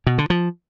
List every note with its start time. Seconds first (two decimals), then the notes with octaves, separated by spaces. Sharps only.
0.07 B2
0.18 D3
0.30 F3